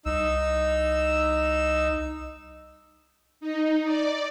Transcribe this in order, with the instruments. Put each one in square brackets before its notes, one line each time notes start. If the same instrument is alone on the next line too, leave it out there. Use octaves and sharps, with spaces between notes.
[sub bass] C2 [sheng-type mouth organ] D#4 E6
[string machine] D#4
D5